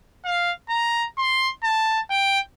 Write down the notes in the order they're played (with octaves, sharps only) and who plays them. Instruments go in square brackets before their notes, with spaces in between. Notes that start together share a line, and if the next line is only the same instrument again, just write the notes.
[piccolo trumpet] F5
A#5
C6
A5
G5